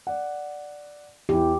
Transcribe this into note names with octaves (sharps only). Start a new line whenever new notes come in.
D5 F#5
E2 E3 G4